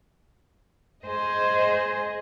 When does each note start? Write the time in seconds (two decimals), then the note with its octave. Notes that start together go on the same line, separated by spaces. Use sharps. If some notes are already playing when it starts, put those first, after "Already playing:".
1.07 G#4 C5 D#5